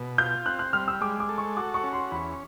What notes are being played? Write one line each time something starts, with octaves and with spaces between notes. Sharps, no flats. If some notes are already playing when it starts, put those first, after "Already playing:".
Already playing: B2
F4 G6
C4 F#6
F#6
G3 F6
E6
G#3 D6
D6
A4
C#6
F#4 D6
C#6
C#4
C6
E2 B5